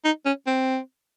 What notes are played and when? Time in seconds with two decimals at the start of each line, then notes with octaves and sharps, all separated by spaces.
0.05 D#4
0.26 C#4
0.47 C4